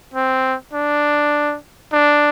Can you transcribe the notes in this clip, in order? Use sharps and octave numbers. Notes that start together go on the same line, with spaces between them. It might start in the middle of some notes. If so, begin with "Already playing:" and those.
C4
D4
D4